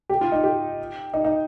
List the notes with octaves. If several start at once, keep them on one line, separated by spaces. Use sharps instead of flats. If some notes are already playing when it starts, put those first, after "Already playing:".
G4
F4
D#4
G4
D#4
D#4